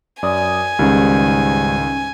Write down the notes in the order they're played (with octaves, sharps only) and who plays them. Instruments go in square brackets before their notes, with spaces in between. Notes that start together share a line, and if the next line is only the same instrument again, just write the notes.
[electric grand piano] F#2 D5 D#6 [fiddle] G#5
[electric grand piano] C#2 D#3 [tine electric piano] G#2 G3 [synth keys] C#4 C#6 G#6